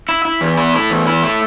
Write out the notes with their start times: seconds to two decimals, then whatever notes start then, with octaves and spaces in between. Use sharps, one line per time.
0.09 E4
0.25 E4
0.41 E2
0.57 E4
0.74 A3
0.90 E2
1.07 E4
1.23 A3